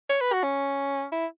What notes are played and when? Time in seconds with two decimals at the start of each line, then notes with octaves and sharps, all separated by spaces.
0.09 C#5
0.21 B4
0.33 F#4
0.43 C#4
1.12 E4